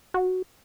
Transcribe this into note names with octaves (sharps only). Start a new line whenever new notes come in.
F#4